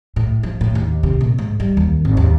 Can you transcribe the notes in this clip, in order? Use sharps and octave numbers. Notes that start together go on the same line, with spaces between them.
A2
F3
A2
D#2
C3
A#2
G#2
G3
D#2
G#1
D#2